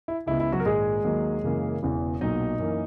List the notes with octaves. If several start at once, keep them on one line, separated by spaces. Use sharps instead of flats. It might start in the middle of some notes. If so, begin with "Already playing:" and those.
E4
C#2 C#3 G#3 B3 E4
E4
F#3 F#4
A#4
A#1 G#2 D#3 G#3 G#4
D#2 D#3 F#3 A#3
F#2 C#3 E3 A#3
E1 E2 C#3 E3 B3
B1 A#2 F#3 D#4 D#5
F#2 E3 A#3